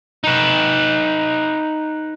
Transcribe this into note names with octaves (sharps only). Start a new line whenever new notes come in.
D#4 B4